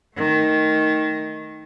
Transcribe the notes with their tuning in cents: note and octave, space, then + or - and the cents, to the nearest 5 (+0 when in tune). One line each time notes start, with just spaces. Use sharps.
D#3 +0 A3 +0